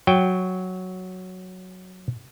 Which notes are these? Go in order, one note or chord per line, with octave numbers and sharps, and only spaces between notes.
F#3 G5